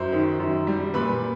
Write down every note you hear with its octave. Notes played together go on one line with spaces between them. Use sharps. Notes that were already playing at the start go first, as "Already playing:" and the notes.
Already playing: F#2 C5
D#3
F#2
G3
A#2 B4 B5